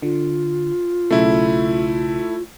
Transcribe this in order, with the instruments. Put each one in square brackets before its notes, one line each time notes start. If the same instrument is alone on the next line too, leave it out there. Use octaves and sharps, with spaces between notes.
[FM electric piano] D3 [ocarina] F4
[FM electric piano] B1 C#3 [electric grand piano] A3 E4